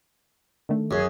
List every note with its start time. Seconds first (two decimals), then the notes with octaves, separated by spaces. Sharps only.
0.69 D3 D#3 A3
0.91 F#2 G#4